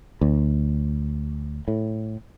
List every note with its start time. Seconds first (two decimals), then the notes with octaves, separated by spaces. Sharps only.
0.21 D2
1.68 A2